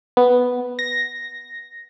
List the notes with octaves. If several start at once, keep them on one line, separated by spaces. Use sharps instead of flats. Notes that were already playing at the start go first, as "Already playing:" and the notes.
B3
A#6